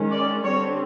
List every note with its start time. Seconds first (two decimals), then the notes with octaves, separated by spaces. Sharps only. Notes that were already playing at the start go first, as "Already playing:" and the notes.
Already playing: D#3 G#3 C#4
0.11 D5
0.43 D3 G3 C4 C#5